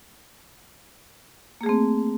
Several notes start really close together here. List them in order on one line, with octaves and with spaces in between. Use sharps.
A#3 G#4 A3 C4